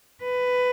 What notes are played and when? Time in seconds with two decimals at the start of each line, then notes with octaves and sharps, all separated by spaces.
0.22 B4